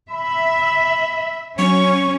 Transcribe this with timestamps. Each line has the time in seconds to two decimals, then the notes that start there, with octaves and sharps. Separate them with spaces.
0.11 E5 B5
1.59 F#3 C#4 C#6